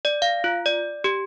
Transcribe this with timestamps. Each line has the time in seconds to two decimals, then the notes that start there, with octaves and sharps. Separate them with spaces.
0.05 D5
0.22 F5
0.44 F4
0.66 D5
1.04 G4